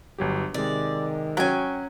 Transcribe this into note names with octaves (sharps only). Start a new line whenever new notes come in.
G1 F#3 G4
C3 D#3 G#3 D5
F#3 C#4 G5 G#5